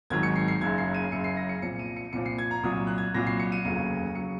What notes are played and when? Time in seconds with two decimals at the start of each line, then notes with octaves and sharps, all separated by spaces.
0.10 G#1 G#2 D#3 F#3 G#6
0.23 C#7
0.36 C7
0.48 C7
0.61 F#1 F#2 C#3 G#6
0.78 C7
0.95 D#7
1.12 F#1 F#2 C#3 C#7
1.24 C7
1.37 A#6
1.49 C#7
1.62 C2 A#2 F3 C#7
1.79 D#7
1.96 C#7
2.13 C2 A#2 F3 C#7
2.26 C7
2.38 G#6
2.51 A#5
2.63 C2 A#2 F#3 D#6
2.87 F#6
2.98 G#6
3.14 C2 A#2 F#3 A#6
3.27 C7
3.40 C#7
3.52 D#7
3.65 F1 D#2 C#3 F#3 D#7
4.15 C#3 F#3 C#7